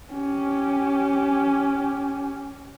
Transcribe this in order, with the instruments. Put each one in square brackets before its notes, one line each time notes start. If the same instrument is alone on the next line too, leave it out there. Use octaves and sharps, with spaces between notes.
[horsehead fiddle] C#4 G4